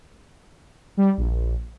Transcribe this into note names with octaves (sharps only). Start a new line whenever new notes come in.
G3
A#1